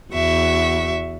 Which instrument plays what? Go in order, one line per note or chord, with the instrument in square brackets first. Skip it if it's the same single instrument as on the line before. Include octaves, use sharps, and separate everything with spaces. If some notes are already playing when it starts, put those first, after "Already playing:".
[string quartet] E2 F#4 E5 C#6